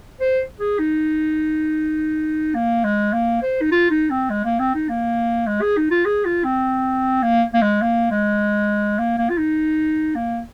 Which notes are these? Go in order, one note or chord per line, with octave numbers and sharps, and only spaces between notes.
C5
G#4
D#4
A#3
G#3
A#3
C5
D#4
F4
D#4
C4
G#3
A#3
C4
D#4
A#3
G#3
G#4
D#4
F4
G#4
F4
C4
A#3
A#3
G#3
A#3
G#3
A#3
A#3
F4
D#4
A#3